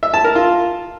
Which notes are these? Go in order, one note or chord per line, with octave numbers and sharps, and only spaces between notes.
E5
A5
A#4
F4